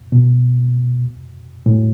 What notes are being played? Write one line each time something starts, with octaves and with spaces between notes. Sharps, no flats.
B2
A2